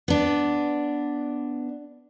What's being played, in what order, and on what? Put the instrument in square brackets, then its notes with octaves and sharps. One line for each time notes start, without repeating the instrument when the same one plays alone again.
[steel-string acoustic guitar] B3 D4